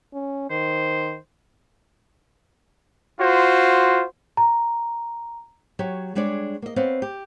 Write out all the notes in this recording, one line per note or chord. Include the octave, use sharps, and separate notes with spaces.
C#4
D#3 C5
F4 F#4 C5
A#5
F#3 G4 C#5
G3 G#3 D4 C#5 D5
A#3 D#5
B3 C4 C#5 D#5 F5
G4